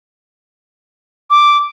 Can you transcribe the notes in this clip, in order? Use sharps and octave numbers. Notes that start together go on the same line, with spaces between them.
D6